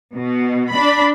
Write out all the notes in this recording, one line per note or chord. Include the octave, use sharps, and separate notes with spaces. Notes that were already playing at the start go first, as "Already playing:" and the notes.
B2
D4 B5